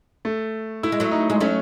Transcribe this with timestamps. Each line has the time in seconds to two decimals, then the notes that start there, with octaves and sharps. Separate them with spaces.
0.25 A3
0.83 A3 E4
0.92 G#3
1.00 F#3 A3
1.11 D#4
1.30 G#3
1.40 F#3 A3 C#4